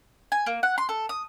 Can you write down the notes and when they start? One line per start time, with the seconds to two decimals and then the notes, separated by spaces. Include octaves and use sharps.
0.32 G#5
0.46 A#3
0.63 F#5
0.78 C6
0.89 A4
1.09 D#6